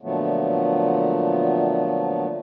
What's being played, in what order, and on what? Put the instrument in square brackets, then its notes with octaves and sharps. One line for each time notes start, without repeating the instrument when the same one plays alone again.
[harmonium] A#2 D3 F3 F#3 A3 B3